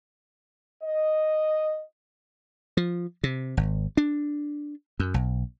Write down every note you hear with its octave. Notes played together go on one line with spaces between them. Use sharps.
D#5
F3
C3
G#1
D4
F#2
B1